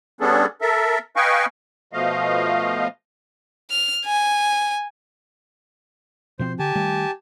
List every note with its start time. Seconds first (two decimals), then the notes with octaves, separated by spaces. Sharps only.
0.21 G3 B3 C#4 D4 G#4 A4
0.61 A4 A#4 E5
1.16 B4 D#5 F5 G5 G#5 C#6
1.93 B2 F3 A3 D#5 F5
3.71 F6
4.05 G#5
6.39 B2 F3 C4 C5
6.59 D3 G4 G#5 A5
6.75 D#3 G3 A3